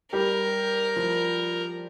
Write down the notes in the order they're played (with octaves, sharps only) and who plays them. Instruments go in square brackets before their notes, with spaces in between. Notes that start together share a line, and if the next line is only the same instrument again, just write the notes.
[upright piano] G3 G4 [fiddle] A#4
[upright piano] F3 F4